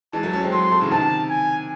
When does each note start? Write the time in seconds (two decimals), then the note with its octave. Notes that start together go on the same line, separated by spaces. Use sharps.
0.13 E3 G#3 A5
0.23 F#3 A3
0.33 A3 C#4
0.43 G#3 C4
0.52 F#3 A3 C6
0.71 F#3 A3
0.81 C#3 E3
0.91 C3 D#3 A5
1.30 G#5